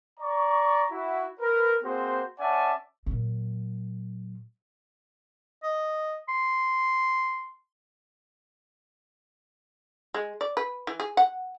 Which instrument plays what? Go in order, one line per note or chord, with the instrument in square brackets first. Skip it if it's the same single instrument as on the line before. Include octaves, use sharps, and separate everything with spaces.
[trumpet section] D5 A#5 C#6
E4 F#4
A#4 B4
A#3 C4 F#4 G#4 C5
C#4 D5 E5 F#5 G#5 A5
[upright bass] A#2 F#3
[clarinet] D#5
C6
[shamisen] G#3
D5
B4
E3
G#4
F#5